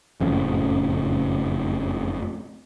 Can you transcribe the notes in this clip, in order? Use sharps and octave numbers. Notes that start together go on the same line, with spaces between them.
F#1 F2 A2 C#3